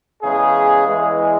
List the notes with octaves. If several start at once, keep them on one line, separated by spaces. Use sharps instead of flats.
E2 C#3 G#3 G#4
E2 E3 G#3